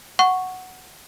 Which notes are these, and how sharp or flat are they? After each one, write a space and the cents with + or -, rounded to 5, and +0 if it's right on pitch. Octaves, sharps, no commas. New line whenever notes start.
F#5 +0 C#6 +0